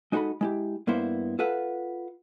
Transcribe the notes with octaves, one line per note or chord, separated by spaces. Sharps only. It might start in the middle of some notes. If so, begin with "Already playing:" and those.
G#3 D#4 F#4 A4 D#5 B5
G#3 E4 G4
G2 A#3 B3 E4 C5
F4 A4 B4 F#5